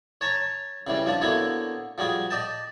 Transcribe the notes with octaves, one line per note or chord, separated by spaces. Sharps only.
C#5 A5 A#5 C#6
C#3 E3 G3
F3 D4 F4
D3 A#3 B3 E4 F#4 C#5
F3 G3 F#4 G#4
D5 D#5 G5 A5